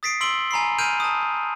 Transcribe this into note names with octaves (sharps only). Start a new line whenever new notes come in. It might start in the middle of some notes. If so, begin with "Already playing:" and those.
D#6 A6 B6 C7 D7
C6 E6 B6 D7 F#7 G7
G#5 A#5 B5 C7
G#5 F6 G6 D7 D#7 F7
A5 D#6